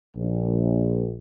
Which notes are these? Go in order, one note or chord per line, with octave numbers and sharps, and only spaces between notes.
A#1